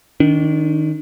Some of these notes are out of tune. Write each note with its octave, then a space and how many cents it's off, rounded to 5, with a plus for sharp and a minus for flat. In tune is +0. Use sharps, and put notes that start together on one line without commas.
D#3 +0 D4 -35